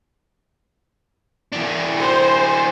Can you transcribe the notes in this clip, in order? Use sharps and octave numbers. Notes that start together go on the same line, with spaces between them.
E3 D4
C5